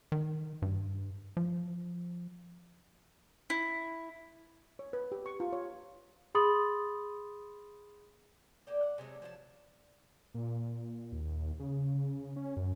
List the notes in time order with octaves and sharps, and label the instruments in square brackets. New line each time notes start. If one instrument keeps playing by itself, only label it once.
[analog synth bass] D#3
G2
F3
[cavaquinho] E4
[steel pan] C#5
B4
G4
C#6
F4
C#5
[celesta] G#4 B5 C6 D#6 A6 F#7
[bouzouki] A#3 B3 G4 D5
F#5
C3 F#3 G#3 A3
F3 F#3 F5 A5
[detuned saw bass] A#2
D#2
C#3
C#3
C#4
F#2